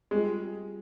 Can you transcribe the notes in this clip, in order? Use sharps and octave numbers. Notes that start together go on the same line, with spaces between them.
G3 G#3 C4 F4 G#4